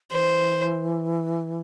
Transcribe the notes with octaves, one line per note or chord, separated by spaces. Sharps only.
E3 C5